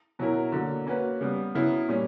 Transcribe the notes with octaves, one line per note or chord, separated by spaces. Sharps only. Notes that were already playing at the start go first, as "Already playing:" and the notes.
B2 F#3 C#4 E4 A#4
D3 F#3 A#3
A#3 C#4 F#4 B4
C#3 G3 B3
C#3 F#3 B3 E4
A#2 G3 C#4